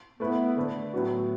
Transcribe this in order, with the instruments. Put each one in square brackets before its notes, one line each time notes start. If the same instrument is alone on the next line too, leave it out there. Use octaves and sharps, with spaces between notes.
[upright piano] A3 E4 B4 [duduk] B3
[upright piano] D3 A3 D4 B4
A2 F#3 B3 F#4